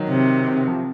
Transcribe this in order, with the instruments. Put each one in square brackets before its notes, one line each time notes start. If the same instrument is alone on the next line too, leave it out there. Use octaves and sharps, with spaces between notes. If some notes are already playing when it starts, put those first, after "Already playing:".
Already playing: [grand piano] D#3 F#3
[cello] C3
[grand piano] F3